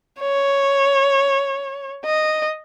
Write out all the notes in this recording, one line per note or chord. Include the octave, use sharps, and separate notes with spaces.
C#5
D#5